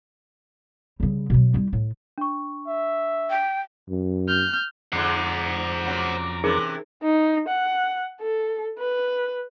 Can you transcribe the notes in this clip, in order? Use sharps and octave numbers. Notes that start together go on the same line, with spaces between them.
C#3 G3
B2 F#3
G3 E4
A2
D4 C#6
E5
G5
F#2
F6 G6
F2 G#2 D3 F3 C5 F#5 A#5 D6
A#2 C#3 F#3
C3 E3 C#4 D#4 G#4 A#4
D#4
F#5
A4
B4